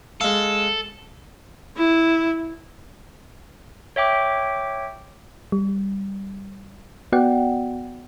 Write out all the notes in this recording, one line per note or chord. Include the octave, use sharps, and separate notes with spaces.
G#3 A4 F5
E4
C#5 E5 G5 D6
G3
B3 F#4 D5 F#5 G5